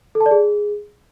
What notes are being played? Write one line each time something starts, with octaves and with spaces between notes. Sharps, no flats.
A4
A5
D5
G#4